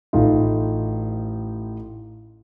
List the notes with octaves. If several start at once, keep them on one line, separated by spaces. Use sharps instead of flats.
A1 A2 D#4 F4